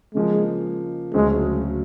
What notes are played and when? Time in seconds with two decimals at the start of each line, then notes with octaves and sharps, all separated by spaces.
0.15 C#3 F3 G#3 A#3
1.14 D2 C#3 F#3 G#3